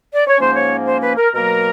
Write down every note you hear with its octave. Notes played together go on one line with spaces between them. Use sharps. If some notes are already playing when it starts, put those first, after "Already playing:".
D5
C#5
G#2 F3 A#3 C#4 C5
C#5
C5
B4
A#4
B2 F#3 A#3 A#4